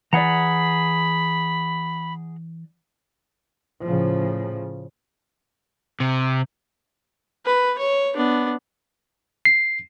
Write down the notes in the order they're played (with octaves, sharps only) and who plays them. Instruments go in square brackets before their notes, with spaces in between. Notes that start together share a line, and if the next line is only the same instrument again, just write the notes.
[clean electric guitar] E3 D5 [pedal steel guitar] G#4 F#5 A#5 [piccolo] B5
[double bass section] A2 C#3 F3
[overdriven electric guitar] C3
[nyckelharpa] B4
C#5
B3 D4
[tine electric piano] C7